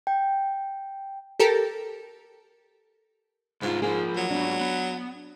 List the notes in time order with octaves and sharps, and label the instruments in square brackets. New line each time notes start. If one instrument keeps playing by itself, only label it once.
[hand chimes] G5
[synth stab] G4 A4 A#4
[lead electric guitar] C2 F4 [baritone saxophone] G#2
[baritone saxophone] G#2 [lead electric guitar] F3 A#3 [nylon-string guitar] G#4
[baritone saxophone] F#3
[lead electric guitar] G#2 B3 [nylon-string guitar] D4
[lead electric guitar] B3